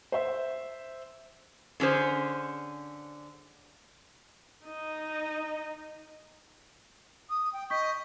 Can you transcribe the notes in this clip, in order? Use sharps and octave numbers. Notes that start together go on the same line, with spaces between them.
C5 E5
D3 C#4 G#4 C5
D#4 D#5
D#6
G5
D#5 C#6 G6 B6